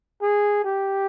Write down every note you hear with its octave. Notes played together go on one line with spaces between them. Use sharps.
G#4
G4